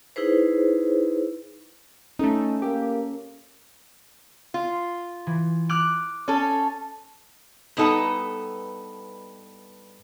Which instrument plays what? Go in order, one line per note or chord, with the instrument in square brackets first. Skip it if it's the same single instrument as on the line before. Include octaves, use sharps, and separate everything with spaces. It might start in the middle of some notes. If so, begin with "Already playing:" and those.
[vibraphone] D#4 E4 G#4 B4 C5
[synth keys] A3 D#4 [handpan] C#4 A4
[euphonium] A#3 [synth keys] G4
[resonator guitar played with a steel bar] F4
[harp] E3
D6 F6 F#6
[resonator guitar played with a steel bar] C#4 A4
G2 B3 D#4 A4 F#5 A#5